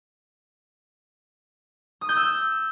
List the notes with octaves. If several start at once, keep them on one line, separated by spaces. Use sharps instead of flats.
D#6
G6
E6